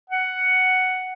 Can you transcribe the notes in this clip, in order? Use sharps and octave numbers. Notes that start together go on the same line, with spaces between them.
F#5